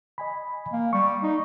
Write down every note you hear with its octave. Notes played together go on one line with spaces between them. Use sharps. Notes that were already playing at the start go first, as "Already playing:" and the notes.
D#5 G#5 B5
A#3
G3 C#6
D#4